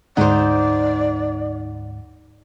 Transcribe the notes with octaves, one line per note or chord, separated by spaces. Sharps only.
D2 G#2 D#4 C5 D5 F#5